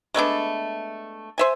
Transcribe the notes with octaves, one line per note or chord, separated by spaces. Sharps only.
G#3 A3 B3 D4
C5 E5 G#5